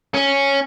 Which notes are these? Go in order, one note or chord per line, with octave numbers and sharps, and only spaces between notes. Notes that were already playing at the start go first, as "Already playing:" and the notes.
C#4